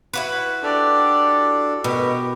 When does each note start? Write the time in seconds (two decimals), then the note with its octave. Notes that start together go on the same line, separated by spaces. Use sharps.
0.13 E4 F#4 B4
0.63 D4 G4 A4 D5
1.84 B2 G4 A#4